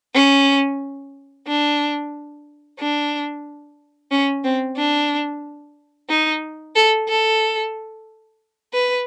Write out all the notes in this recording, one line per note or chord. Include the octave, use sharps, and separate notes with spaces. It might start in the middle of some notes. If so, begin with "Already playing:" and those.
C#4
D4
D4
C#4
C4
D4
D#4
A4
A4
B4